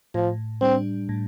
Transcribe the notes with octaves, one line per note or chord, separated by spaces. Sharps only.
A2 F3
G3 C4 D4
A2